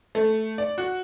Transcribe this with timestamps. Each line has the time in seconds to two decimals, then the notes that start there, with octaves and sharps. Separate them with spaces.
0.15 A3
0.58 D5
0.78 F#4